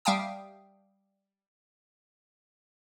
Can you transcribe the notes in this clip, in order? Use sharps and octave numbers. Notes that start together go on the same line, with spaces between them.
G3 E5 F5 G5 A5 D#6